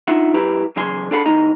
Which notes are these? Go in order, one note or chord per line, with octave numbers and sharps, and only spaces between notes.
D4 D#4 F4 E5 F#5
F#2 E4 G4 B4 A#5
E2 C#3 F#3 G#4 G#5 C6
D4 G#4 A4 F5 F#5 B5
C2 A2 D#4 D#5 A#5